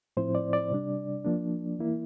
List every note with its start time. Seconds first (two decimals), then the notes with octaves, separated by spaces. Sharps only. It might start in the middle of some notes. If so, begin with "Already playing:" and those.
0.17 A2 F3 C4 E4 C5
0.35 D5
0.53 D5
0.71 C3 G3 D4
1.24 F3 A#3 D4
1.79 E3 A#3 E4